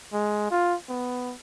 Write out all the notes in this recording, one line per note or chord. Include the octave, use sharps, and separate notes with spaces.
G#3
F4
B3